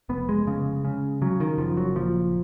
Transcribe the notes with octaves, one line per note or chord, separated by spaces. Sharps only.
F1 B3
G#3
C#3
C#3
C#3 F#3
D#3
F#1 F3
F#3
A#2 F3